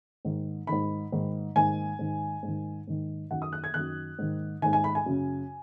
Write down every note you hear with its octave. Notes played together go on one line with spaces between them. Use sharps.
G#2 D#3
G#2 D#3 B5
G#2 D#3
G#2 D#3 G#5
G#2 D#3
G#2
D#3
G#2 D#3
F#2 D#3 F#5
D#6
F#6
G#6
F#2 D#3 F#6
G#2 D#3
G#2 D#3 G#5
G#5
B5
G#5
F#2 C#3